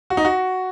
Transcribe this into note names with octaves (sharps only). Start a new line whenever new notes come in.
F#4
D#4
F#4